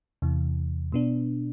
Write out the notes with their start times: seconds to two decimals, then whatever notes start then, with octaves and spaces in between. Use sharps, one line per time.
0.22 E2 C3 E3
0.92 B2 B3 D4